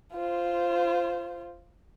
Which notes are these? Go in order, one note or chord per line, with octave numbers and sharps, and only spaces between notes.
F4 C5